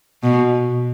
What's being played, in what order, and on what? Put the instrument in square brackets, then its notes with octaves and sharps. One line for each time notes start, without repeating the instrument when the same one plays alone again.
[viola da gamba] B2